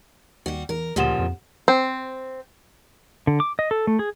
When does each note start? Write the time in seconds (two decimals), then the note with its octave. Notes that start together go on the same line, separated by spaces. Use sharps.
0.46 D#2 G3 F#4
0.69 E2 A#4
0.96 D2 A#2 C#3 F3 G4 F#5 E7
1.19 F2
1.68 C4
3.27 D3
3.40 D6
3.59 D#5
3.71 A4
3.87 A3
3.99 G#4